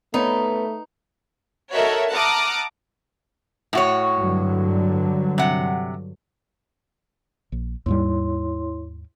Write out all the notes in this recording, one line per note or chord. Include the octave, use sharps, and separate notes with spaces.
A3 B3 D#4 B4 C#5
D#4 F#4 A4 A#4 C#5 E5
F#5 A5 A#5 D6 D#6 F6
A2 F#4 C#5
G2 D3 F#3
C3 F#5
A#1
D#2 G#2 G3 E4 C#5 C6